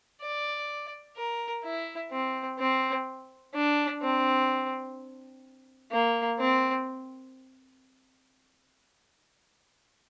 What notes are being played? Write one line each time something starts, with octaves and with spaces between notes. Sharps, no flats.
D5
A#4
E4
C4
C4
D4
C4
A#3
C4